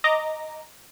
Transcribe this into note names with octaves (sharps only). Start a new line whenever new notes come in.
D#5 A#5 D6